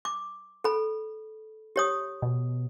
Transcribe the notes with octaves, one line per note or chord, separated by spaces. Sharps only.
D6
A4 B5
G4 C#5 D#6
B2